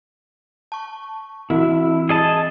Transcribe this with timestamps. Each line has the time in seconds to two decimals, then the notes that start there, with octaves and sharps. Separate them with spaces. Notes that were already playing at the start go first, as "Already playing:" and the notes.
0.72 A5 C#6
1.50 E3 C4 E4 F#4
2.09 G#4 D#5 A5